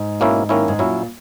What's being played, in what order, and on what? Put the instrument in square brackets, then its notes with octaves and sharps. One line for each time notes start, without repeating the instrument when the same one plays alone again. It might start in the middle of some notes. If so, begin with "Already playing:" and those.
Already playing: [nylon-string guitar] G#2
[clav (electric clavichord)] B2 A#3 C#4 E4
D#3 A#3 C#4 E4
[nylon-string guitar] G#2
[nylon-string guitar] A#2 [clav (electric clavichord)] F#3 C#4 E4